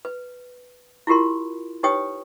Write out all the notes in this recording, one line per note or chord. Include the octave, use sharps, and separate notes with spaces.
B4
E4 F4 G4 A#4 C6
D#4 G4 B4 C#5 G5 D#6